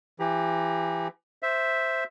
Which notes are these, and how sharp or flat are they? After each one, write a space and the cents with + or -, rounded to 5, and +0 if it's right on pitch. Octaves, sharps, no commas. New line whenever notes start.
E3 +30 G4 +30 A#5 +35
C5 +0 E5 +0